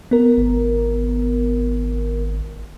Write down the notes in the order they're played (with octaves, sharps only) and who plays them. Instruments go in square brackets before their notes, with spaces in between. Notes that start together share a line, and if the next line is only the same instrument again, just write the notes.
[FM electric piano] B3 A#4
[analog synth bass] G#1